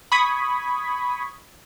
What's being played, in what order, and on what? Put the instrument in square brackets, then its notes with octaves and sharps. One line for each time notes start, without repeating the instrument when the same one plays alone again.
[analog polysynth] B5 C#6 D#6 G#6 B6